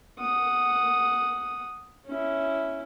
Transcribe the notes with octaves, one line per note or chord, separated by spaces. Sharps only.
F#5 D#6
C#4 E4